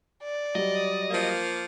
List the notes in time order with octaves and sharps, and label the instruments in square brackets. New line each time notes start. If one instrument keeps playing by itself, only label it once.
[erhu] D5
[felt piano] F#3 G3 [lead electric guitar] D#5
[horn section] F3 A#3